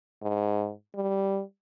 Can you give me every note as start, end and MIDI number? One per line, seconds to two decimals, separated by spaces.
0.22 0.71 44
0.95 1.41 55